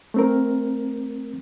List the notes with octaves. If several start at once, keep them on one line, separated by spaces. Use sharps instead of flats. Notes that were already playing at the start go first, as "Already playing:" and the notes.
A3 C4 A#4